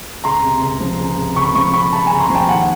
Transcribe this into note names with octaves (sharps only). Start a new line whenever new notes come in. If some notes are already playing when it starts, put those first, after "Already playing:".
C#2 A#5 C6
C3
C#2
F3
C#2
C3
C#2 B5 C#6
F3 B5 C#6
C#2 B5 C#6
C3 A5 B5
G#5 A#5
C#2
A#5 C6
F3
G5 A5
D#2 F#5 G#5